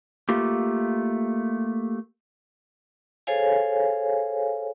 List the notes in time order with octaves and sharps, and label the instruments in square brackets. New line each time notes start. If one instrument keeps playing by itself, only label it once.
[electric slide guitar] A3 A#3 F4 G4
[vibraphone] G#4 A4 C5 C#5 F5 G#5